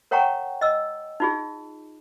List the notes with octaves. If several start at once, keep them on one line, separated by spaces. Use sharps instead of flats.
A#4 C#5 F#5 G5 A#5 C#6
D#5 E6
D#4 F4 G#4